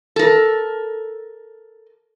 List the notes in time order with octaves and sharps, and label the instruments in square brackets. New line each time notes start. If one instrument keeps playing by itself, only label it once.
[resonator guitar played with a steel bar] A4 A#4